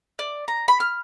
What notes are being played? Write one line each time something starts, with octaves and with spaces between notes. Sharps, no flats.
D5
A#5
B5
F6